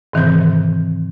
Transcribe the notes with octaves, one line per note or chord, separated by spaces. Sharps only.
G#2 C3 D#3 E3 C4 G6